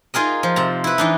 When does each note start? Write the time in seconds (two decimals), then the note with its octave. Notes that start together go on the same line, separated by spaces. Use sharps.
0.14 D#4 F4 G#4 A#4 D#5
0.43 F3
0.56 C3 A5 A#5
0.84 E4 B4
0.98 E3 D4 D#4